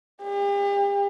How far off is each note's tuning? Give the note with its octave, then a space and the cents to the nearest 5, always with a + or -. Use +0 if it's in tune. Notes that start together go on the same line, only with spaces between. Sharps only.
G4 +40